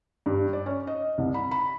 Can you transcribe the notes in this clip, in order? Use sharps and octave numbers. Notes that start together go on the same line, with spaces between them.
G2
D5
C#4
D#5
C2
B5
B5